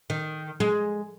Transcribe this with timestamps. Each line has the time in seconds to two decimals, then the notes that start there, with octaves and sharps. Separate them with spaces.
0.10 D#3
0.60 G#3